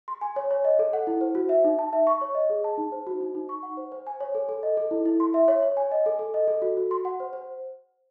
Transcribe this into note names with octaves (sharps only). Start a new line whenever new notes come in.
C6
G#5
C#5
C#5
D#5
A4
F#5
E4
C5
F#4
E5
D#4
A5
E5
C#6
C#5
D#5
G#4
A5
D#4
C5
F#4
D#4
D#4
C#6
F#5
C5
C5
G#5
C#5
A4
A4
D#5
A4
E4
E4
C6
E5
C#5
C#5
G#5
D#5
A4
A4
D#5
A4
F#4
F#4
C6
F#5
C5
C5